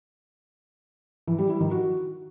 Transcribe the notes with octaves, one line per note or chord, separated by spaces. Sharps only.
E3
G3
E4
D#3
F#4